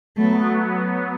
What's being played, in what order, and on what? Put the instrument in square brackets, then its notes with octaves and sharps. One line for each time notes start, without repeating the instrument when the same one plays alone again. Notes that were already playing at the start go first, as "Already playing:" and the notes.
[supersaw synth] F#3 B3 [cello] A3